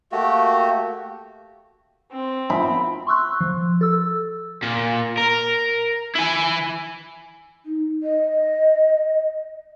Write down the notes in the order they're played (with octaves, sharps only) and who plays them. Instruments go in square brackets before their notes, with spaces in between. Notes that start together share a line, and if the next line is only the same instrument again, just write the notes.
[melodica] A3 A#3 F#4 G4
[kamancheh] C4
[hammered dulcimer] B5
[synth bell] C6 C#6 E6 F#6
F3
A4 E6
[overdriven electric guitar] A#2
A#4
E4 G#5
[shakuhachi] D#4
D#5